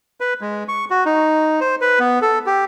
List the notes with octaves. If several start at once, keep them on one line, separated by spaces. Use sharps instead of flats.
B4
G#3
C#6
F#4
D#4
C5
B4
B3
A4
G4